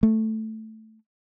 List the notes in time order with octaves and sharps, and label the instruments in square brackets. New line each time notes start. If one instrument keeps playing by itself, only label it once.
[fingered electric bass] A3